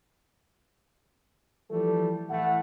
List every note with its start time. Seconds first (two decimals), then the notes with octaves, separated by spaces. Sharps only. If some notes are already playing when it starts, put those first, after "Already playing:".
1.71 E3 F3 G3 A3 A4
2.30 A2 E3 A3 E4 F#5